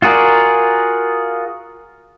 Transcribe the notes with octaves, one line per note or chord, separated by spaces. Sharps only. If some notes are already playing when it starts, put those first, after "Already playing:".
F4 F#4 G#4 A#4 D5